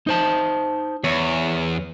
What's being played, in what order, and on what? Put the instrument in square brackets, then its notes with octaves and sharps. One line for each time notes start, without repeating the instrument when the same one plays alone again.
[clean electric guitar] D#4 C5 A5
[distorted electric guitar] E2 [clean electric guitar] C#5